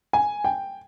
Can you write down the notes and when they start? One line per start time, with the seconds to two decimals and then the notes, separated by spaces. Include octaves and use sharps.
0.13 G#5
0.44 G5